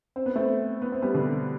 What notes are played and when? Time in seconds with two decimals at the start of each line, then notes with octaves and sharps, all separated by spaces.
0.16 C4
0.26 B3
0.35 A3 C4
0.82 B3
0.92 C4
1.02 G3 B3
1.14 B2 D3